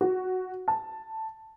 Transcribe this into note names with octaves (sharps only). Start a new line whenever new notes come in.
F#4
A5